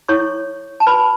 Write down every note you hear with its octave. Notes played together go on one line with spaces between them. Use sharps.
E4 A4 C#5 C#6
A5
F#4 B4 B5